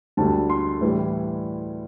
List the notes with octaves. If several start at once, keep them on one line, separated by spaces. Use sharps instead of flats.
D2 D3 G3 A5
C6
A2 E3 G3